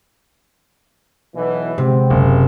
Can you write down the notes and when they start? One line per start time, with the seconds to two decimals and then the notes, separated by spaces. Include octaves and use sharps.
1.35 B1 B2 E3
1.78 C3 G#3 B3 C4
2.10 F#1